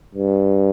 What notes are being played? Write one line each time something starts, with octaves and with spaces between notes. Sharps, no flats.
G2